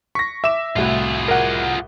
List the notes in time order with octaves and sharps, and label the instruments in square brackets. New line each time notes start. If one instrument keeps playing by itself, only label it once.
[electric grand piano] C#6 A#6 [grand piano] B6
[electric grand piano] E5 E7 [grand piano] D6
[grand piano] C2 A2 F#4 [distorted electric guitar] F4 G#4
[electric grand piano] A#4 F#5